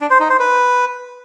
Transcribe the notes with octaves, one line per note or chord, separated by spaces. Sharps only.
D4
C5
D#4
C5
B4